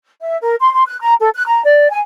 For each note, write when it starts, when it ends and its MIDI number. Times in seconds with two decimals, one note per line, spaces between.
0.20 0.36 76
0.41 0.55 70
0.60 0.73 84
0.73 0.83 84
0.87 0.99 90
1.00 1.13 82
1.19 1.29 69
1.34 1.45 90
1.46 1.61 82
1.64 1.90 74
1.90 1.98 80